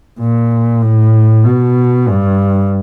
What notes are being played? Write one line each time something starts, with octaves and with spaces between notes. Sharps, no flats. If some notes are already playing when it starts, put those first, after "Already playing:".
A#2
A2
B2
G2